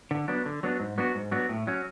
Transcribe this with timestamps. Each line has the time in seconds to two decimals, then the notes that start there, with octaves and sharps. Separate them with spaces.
0.11 D3
0.28 F#3 B3 D4
0.46 D3
0.63 F#3 B3 D4
0.80 G#2
0.98 F#3 B3 D4 F#4
1.15 G#2
1.31 F#3 B3 D4 F#4
1.49 A2
1.67 F#3 C#4